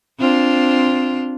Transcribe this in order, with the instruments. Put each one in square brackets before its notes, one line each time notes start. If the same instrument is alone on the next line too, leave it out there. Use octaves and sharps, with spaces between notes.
[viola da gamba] C4 D4 F4